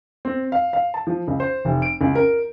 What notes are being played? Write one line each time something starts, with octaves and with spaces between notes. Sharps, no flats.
C4
F5
F5
A5
F3
C#2
C5
F1
D7
C#2
A#4